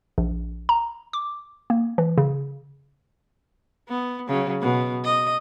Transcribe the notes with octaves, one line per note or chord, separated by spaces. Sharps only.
A#1
A#5
D6
A#3
E3
C#3
B3
C#3 F#3
B2
D#5